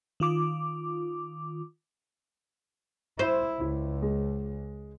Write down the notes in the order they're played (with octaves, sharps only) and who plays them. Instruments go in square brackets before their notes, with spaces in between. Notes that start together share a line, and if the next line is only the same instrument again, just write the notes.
[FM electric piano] D#3 F4 D6
[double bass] E4 [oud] C5
[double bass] C#2 [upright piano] E4
[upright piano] G#3